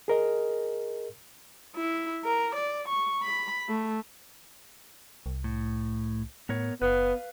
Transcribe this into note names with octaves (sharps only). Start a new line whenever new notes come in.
G#4 A#4 D#5
E4
A#4
D5
C#6
B5
A3
C2
A2
A2 B3 A#4 C#5
F#1 B3 B4 F5